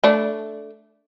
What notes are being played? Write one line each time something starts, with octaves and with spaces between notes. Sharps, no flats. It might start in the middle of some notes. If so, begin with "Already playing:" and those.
A3 D4